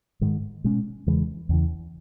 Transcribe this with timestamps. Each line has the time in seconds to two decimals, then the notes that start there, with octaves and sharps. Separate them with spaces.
0.21 G#2 D#3 G#3
0.64 B2 G#3 C#4
1.07 E2 C#3 E3 G#3
1.49 E2 C#3 E3